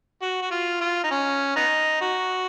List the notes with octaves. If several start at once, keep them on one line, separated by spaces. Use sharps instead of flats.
F#4
F#4
F4
F4
D#4
C#4
B3 D#4
F#4